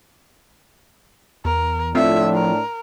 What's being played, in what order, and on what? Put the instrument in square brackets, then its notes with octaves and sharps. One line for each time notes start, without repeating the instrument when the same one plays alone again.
[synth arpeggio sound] E2 [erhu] A#4
[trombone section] A2 A3 D4 [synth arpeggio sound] F3 C4 F4 [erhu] E5
[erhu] A#4